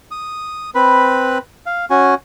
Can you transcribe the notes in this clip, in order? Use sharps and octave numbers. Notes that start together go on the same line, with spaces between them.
D#6
C4 B4 B5
F5
C#4 F#4 G#5